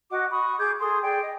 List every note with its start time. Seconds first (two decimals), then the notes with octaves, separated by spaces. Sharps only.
0.11 F#4 D#5 F#5 D6
0.30 B5 C#6 D#6
0.58 G#4 D6 G6 G#6
0.80 G#4 A4 C6 D#6
1.02 G#4 D5 G5
1.22 D#5